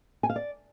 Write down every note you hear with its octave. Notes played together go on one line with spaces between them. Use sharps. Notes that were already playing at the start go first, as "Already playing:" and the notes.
G#5
F5
D5